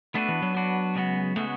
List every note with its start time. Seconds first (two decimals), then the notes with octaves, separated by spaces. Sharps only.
0.15 A3 B3 D4 F#4 B4
0.28 E3
0.42 F#3
0.55 B3 D4 F#4 B4
0.95 C#3 G#3 B3 F#4
1.36 C#3 G#3 A3 B3 F#4